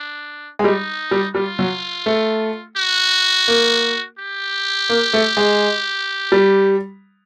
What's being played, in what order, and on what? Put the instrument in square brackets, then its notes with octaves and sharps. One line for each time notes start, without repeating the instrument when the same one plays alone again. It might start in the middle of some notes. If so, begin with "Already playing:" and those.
Already playing: [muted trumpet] D4
[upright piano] G#3
[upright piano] G3 [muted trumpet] D#4
[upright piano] G3
[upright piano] G3 [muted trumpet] F4
[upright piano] F#3
A3
[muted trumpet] F#4
[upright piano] A#3
[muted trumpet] G4
[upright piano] A#3
A3
G#3
G3